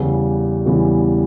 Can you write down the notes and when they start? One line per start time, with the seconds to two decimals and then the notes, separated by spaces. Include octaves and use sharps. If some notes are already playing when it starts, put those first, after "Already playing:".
Already playing: E2 C#3 E3 G3
0.66 E2 C#3 E3 G3